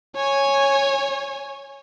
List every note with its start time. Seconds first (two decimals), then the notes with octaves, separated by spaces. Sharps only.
0.16 C#5 G#5